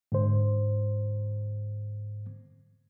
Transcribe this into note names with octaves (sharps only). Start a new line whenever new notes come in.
G#2 D3 C5